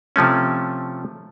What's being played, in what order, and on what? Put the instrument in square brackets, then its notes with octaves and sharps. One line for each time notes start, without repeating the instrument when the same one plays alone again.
[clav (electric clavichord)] C3 F3 A3 C#4